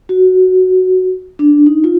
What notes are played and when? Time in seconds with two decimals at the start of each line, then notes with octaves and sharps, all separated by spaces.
0.09 F#4
1.39 D4
1.66 D#4
1.84 F4